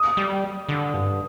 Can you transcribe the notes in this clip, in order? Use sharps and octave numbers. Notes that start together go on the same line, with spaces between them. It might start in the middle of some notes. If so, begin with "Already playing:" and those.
Already playing: D#6
G3
D3
G2